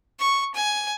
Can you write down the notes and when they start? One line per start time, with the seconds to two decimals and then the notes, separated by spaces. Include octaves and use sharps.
0.19 C#6
0.54 G#5